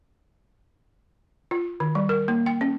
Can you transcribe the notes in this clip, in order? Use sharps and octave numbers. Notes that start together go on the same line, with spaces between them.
F4
D#3
G3
A#4
A#3
G5
C#4